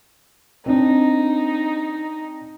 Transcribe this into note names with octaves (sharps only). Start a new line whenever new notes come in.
C4 D4 D#4